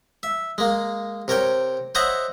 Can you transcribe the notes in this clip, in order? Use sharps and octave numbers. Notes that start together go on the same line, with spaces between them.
E5
G#3 A#3
C3 A#4 C#5 G5
C5 C#5 D#5 E5 F#5 A#5